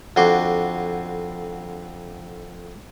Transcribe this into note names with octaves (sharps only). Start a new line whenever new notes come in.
F2 D3 F#4 C6 D6